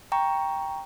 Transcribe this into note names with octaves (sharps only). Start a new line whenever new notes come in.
G5 A#5 C#6